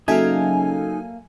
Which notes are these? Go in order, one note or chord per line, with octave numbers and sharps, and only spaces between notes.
C#3 F#3 A#3 D#4 A4 E5 F5 G#5